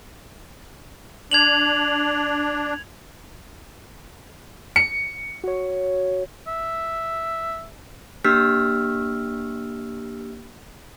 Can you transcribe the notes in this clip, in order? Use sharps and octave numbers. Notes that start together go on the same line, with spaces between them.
D4 G#6 F7 F#7
C#7
F#4 C#5
E5
A#3 D4 G4 E6 F6 B6